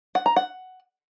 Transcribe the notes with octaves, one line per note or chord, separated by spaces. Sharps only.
F#5
A#5
F#5